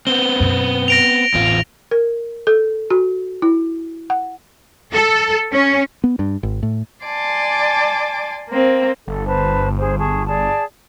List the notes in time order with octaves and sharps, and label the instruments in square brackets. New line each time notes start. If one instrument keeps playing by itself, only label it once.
[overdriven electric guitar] B3 C4 [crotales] G7
[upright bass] F#2 B2
[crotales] A#6 D7 F7
[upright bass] A1 [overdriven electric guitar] E2 F4
[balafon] A#4
A4
F#4
E4
F#5
[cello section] A4
C#4
[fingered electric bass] B3
G2
G#1
A2
[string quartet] D5 G#5 A5 C6 D6
A#3 C4
[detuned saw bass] G1 [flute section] A4
[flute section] B4 C5 A5
G#4 C5
G#4 A5 C#6
G#4 D5 A5